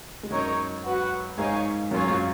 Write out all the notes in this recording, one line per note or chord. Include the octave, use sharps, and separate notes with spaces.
G#3
F#2 F#3 D#4 A#4 C#5
F#4 B4 F#5
G#2 G#3 D#4 A#4 C#5 F5 G#5
F#2 F#3 A#3 F4 G#4 C#5 F5
F#2 F#3